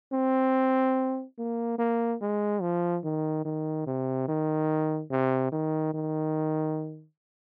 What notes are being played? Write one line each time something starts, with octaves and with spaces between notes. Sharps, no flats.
C4
A#3
A#3
G#3
F3
D#3
D#3
C3
D#3
C3
D#3
D#3